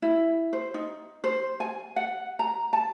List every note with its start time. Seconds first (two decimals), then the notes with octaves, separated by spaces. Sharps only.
0.02 E4
0.53 C5
0.74 D#4
1.24 C5
1.60 G#5
1.96 F#5
2.39 A#5
2.73 A5